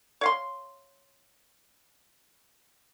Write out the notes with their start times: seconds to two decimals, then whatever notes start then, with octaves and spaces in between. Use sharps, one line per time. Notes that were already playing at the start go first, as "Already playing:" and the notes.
0.21 C#5 F5 C6